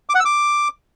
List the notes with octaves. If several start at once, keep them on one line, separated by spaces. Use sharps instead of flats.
D6
F#5
E6
D6